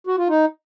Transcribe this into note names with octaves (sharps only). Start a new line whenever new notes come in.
F#4
F4
D#4